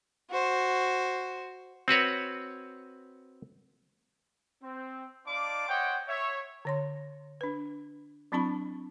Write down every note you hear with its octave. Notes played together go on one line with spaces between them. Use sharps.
F#4 C5
C4 F#4 B4 C#5
C4
D#4 D5 F5 A5 C6 D6
C5 C#5 D#5 F#5 G5
C#5 E5
D3 C#5 C6
D4 B4
F#3 C4 D4 E4 A5 B5